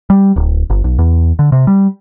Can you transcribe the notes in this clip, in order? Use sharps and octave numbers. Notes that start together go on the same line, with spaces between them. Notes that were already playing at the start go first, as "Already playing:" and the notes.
G3
D1
G1
B1
E2
D3
C3
G3